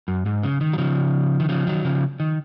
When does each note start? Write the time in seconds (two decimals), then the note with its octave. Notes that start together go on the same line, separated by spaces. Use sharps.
0.08 F#2
0.26 G#2
0.43 C#3
0.61 D#3
0.73 F#3
0.78 C#3 F3
1.40 D#3
1.49 C#3 F3
1.67 D#3 F#3
1.85 C#3 F3
2.20 D#3